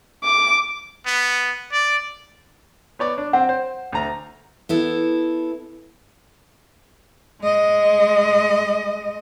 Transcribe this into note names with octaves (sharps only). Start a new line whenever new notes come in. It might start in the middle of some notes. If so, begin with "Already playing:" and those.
D6
B3
D5
B3 C#5 D5
D4
C4 F#5
C5
D2 A#5
B3 E4 A4
G#3 D#5